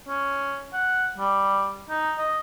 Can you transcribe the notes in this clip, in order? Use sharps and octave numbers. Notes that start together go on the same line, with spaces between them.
C#4
F#5
G3
D#4
D#5